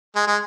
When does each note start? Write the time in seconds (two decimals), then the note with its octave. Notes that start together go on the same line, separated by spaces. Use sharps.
0.16 G#3
0.27 G#3